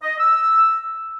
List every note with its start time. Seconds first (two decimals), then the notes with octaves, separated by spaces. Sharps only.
0.03 D#5
0.19 E6